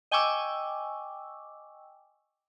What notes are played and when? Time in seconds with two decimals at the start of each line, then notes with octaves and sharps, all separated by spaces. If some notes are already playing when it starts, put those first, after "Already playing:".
0.11 D#5 G5 G#5 C#6 D6 E6